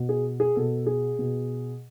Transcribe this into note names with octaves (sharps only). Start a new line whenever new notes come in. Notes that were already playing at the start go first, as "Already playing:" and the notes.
Already playing: B2
G#4
G#4
B2 A4
G#4
B2